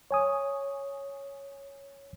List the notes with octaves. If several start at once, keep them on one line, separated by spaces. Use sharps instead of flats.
C#5 G#5 D#6